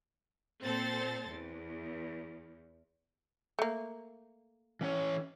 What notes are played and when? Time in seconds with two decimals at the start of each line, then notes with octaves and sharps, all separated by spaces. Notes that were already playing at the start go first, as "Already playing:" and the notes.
0.62 A#2 C4 A4 C5 A6
1.32 E2
3.59 A3 A#3
4.81 E3 C#4 C#5